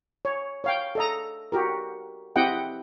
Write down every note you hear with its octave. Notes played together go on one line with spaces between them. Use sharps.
C#5
C#5 F5 G5
A4 D#5 A#5
F#4 G4 A#4
C4 E4 G4 D#5 F#5 G5